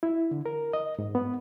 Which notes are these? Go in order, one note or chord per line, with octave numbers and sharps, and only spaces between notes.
E4
D3
A#4
D#5
G#2
B3